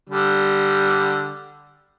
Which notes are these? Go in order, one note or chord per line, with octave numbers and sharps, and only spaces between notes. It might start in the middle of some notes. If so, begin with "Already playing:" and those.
D3 G3